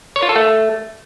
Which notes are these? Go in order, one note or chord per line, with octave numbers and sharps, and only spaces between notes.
C#5
F4
A4
A3